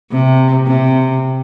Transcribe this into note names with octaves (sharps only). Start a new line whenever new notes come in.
C3
C3